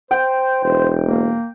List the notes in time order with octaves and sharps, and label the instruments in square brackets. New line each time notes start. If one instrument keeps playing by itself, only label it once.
[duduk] C5 [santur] G5
[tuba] E1 [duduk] C5
[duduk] A#3